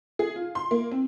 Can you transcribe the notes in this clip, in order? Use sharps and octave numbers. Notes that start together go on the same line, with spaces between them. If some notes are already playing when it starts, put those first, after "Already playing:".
G#4
F4
C6
A#3
C4